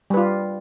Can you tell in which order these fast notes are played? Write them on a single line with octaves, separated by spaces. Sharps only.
G3 B4 F4